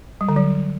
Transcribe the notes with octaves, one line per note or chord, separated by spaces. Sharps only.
G3
D3
F#3